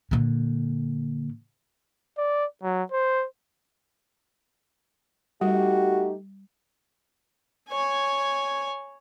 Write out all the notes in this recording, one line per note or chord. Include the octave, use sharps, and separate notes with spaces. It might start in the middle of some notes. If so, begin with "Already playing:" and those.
A#2 D3
D5
F#3
C5
G3 A3 D#4 F#4 G4
C#5 G#5